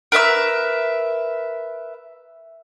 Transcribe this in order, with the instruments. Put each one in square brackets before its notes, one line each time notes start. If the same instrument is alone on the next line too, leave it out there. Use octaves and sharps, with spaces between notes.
[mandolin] A#4 B4 E5 E6